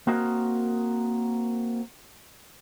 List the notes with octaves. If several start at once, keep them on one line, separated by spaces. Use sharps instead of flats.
A#3 C4 F#4 A#4 D#5